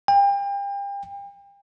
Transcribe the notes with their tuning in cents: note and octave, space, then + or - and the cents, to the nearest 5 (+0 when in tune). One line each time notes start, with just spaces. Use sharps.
G5 +35